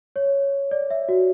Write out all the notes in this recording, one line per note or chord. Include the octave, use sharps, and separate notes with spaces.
C#5
D5
E5
F#4